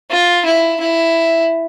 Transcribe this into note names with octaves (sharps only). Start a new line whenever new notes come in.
F4
E4
E4